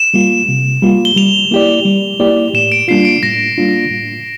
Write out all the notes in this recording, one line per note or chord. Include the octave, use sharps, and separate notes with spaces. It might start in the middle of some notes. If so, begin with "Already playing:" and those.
Already playing: E7
G3 A#3 F4
C3
G3 A#3 F4
G7
G3 F7
A#3 E4 G4 D5
G3
A#3 E4 G4 D5
A2 E7
D7
G3 A#3 D4 F4 C7
D7
A2 A#6
G3 A#3 D4 F4
A2